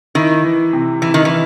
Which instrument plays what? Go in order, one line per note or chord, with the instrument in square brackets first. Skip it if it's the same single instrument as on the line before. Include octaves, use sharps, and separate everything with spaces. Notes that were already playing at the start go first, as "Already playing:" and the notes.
[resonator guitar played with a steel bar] D#3 [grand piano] E4
[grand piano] E3
C3
[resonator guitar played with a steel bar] E3 [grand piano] E4
[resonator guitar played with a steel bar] D#3
E3